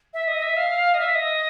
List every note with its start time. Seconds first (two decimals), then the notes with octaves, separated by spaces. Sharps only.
0.14 E5
0.28 D#5
0.42 E5
0.57 F5
0.94 D#5
1.00 E5
1.15 D#5